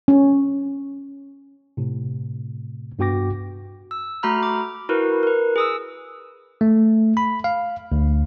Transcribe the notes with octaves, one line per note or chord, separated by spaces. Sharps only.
C#4
A2 C3
G2 B3 F#4 G5 D6 A#6
E6
A3 F#4 A#5 B5 F6
D6
E4 F#4 A#4 B4
A#4 B4
G#4 D#6 E6
A3
B5
F5
D2